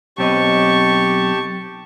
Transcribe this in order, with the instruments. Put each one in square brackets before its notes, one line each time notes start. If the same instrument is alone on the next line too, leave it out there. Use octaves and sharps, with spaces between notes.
[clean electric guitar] B1 C4 D#5 [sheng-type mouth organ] G4 A5 [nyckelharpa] C#6